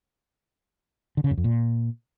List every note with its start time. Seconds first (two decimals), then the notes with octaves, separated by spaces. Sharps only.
1.17 D3
1.24 C#3
1.31 F#2
1.38 F2
1.44 A#2